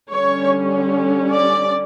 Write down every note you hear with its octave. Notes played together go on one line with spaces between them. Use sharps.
D3 G3 C#4 C#5
D5